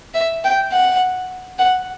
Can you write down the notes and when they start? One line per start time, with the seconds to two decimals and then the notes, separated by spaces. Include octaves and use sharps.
0.14 E5
0.44 G5
0.72 F#5
1.59 F#5